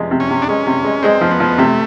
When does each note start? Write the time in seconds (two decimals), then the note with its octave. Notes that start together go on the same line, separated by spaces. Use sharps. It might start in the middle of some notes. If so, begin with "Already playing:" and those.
Already playing: C3 F3 G#3
0.11 C3
0.20 C#4
0.30 C3
0.42 D4
0.48 G#3 C#4
0.66 C3
0.84 G#3
1.03 G#3 C4
1.21 F3
1.31 B3
1.40 F3
1.58 C3 A3